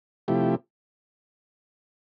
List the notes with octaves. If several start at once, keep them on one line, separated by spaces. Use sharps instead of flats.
C3 F3 A3 E4 G4